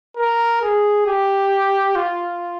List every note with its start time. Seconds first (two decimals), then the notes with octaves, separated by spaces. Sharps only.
0.17 A#4
0.62 G#4
1.06 G4
1.96 F4